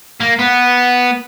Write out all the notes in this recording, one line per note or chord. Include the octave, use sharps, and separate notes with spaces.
A#3
B3